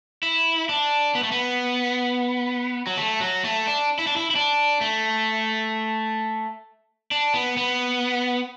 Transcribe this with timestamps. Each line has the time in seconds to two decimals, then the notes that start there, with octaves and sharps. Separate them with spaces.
0.23 E4
0.69 D4
1.15 B3
1.23 A3
1.32 B3
2.87 F#3
2.97 A3
3.21 F#3
3.44 A3
3.67 D4
3.99 E4
4.07 D4
4.16 E4
4.31 E4
4.36 D4
4.81 A3
7.11 D4
7.34 B3
7.57 B3